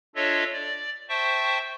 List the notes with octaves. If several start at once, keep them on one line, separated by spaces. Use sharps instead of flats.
D4 F4 A4 C#5 D#5 E5
D5
C5 E5 G5 A5 C#6